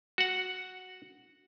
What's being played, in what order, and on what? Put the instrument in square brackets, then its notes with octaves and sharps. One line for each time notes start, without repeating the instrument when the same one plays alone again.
[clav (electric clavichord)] F#4 F#5